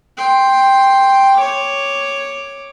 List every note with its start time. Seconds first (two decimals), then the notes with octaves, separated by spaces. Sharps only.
0.17 G5 C6
1.36 C#5 D6